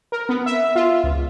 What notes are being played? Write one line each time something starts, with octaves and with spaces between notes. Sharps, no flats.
A#4
B3
E5
F4
C#2